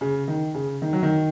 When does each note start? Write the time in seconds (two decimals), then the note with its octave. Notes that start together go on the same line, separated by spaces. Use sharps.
0.01 C#3
0.28 D#3
0.54 C#3
0.82 D#3
0.93 F#3
1.03 D#3